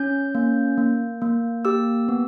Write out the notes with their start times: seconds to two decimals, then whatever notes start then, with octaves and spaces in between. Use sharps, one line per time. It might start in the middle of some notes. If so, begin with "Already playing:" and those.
Already playing: C#4 G6
0.35 A#3
0.78 A#3
1.22 A#3
1.65 G4 E6
2.09 B3